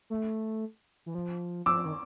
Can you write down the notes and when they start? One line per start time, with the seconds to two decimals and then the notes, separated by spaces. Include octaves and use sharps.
0.10 A3
1.06 E3
1.15 F3
1.66 F3 D6 E6
1.85 D#3